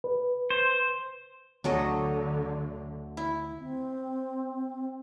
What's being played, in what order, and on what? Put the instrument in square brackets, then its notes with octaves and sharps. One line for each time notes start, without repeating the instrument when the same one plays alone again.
[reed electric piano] B4
[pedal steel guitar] C5
[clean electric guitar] D2 [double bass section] D3 [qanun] F#3 A4 D#5
[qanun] E4
[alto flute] C4